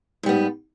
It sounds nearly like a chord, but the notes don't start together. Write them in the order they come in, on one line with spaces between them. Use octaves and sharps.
G#2 G3 B3